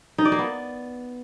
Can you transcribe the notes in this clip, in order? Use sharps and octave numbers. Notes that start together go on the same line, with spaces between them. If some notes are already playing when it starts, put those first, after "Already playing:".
D#4
D5
A#3
B3